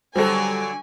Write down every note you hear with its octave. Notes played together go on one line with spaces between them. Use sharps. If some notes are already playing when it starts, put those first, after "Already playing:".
D3 F#3 G3 D4 A4 C5 G#5